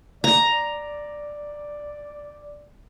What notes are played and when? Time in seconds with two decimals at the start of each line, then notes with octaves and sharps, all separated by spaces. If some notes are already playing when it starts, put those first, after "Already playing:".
0.24 D5 A#5